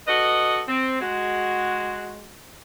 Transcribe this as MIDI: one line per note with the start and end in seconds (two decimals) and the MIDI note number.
0.07 0.62 66
0.07 0.62 69
0.07 0.62 71
0.07 0.62 75
0.68 0.99 60
1.00 2.33 56
1.00 2.33 66